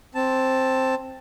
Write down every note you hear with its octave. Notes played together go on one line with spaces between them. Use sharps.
C4 A5